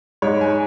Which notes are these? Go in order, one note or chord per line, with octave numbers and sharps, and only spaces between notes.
G#2 C#5
G#5